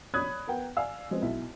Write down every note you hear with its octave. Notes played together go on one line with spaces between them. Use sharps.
C#5 D5 B5 D#6 F#6 G#6
B3 A#4 F#5 G5
D5 F5 G#5 E6
F3 G#3 B3 C4
B1 E4 E5